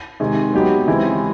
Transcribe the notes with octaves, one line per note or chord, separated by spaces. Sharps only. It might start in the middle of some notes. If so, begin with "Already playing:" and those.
C3 D#3 G#3
F#3 B3 D#4 G4
C#3 E3 G#3 C4 E4